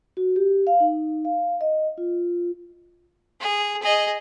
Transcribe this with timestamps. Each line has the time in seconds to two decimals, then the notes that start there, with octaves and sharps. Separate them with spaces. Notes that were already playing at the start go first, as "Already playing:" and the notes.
0.17 F#4
0.36 G4
0.67 F5
0.80 D#4
1.25 F5
1.61 D#5
1.98 F4
3.41 G#4
3.83 G#4 D#5